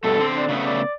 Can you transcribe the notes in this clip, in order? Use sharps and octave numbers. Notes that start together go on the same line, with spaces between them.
G2 B2 A3 A4
D3 C4
D4
C#3 A3 B3
D5